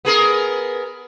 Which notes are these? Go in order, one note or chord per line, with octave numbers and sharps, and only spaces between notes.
B3 G#4 A#4